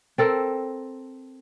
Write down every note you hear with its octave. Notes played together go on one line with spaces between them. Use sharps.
C4 A4 A#4